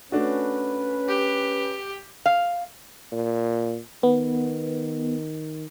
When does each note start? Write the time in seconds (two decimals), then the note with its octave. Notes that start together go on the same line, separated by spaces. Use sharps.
0.12 A3 C#4 D4 F#4 B4
1.08 G4
2.26 F5
3.12 A#2
4.03 D#3 B3